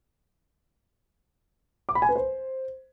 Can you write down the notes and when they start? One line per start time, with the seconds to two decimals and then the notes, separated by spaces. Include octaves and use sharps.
1.89 D6
1.95 B5
2.02 G#5
2.09 B4
2.16 C5